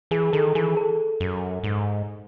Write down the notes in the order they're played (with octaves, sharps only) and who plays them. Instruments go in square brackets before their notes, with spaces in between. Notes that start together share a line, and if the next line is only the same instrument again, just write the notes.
[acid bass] E3 [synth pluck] G#4
[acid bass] D#3 [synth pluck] A4
[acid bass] E3 [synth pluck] G#4
[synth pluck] A4
[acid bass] F#2
G#2